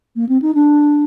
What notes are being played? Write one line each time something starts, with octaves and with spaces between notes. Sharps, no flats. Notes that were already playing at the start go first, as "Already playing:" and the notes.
A#3
C4
D#4
D4